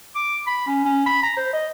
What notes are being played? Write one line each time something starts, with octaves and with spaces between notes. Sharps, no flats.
D6
B5
C#4
C#4
B5
A#5
C5
D#5